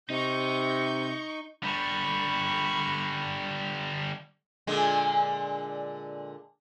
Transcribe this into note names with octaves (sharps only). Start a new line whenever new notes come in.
C3 D#4 C#6 G6
D3 G3 B5 C#6
A#2 D3 G#3